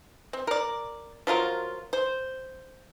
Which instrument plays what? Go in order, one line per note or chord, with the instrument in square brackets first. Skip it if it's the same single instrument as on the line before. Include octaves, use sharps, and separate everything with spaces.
[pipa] C4
A#4 D5
F3 F#3 F4 A#4
C5